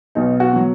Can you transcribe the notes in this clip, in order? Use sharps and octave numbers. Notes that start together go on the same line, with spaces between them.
B1 D#4
F#4
B2 F#3